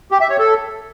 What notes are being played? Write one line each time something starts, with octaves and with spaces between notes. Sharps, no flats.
G4
E5
C#5
A4